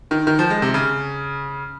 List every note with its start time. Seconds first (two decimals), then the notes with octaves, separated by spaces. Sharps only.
0.11 D#3
0.27 D#3
0.39 F3
0.50 G#3
0.62 C3
0.74 C#3